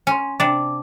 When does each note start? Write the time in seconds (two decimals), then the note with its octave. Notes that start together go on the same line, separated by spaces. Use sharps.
0.07 C#4 G#5 C6
0.40 C3 D4 D6